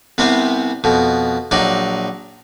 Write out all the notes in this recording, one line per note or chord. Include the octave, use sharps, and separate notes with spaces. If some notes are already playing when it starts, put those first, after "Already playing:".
C2 C3 B3 C4 C5
F2 B2
A#1 F#3 D#4 D5